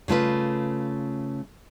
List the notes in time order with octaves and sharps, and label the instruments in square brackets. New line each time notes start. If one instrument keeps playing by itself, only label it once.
[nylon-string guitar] C#3 A3 F4 B4